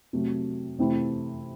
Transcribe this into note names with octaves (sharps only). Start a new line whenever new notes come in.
C3 F#3 A3
C3 E3 A3 C4 E4